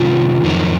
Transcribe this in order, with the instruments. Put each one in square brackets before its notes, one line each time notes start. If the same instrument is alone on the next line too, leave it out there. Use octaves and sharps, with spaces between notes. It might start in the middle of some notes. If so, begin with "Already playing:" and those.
Already playing: [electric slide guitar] C3 D#3 F#3 C#4 F4
F2 D#3 F#3